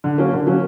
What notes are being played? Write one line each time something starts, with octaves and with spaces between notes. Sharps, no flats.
D3
F#3 A#3 C#4
D3
F#3 A#3 C#4